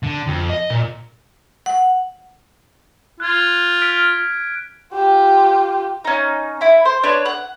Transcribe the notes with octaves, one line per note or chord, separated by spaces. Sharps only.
D3
F2
D#5
A#2
F#5
F4 F#6 G#6
F6 B6 D7
F4 G4
C#4 D#4
E4 B5
C5
D4 B4 C#5
F#5